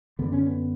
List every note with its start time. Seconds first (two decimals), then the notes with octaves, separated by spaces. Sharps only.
0.19 F#2 D3 B3
0.32 C#4
0.46 B3